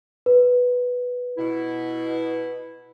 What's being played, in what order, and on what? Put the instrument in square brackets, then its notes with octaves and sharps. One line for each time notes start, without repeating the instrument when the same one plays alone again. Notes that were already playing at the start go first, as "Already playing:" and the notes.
[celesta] B4
[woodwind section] B2 E4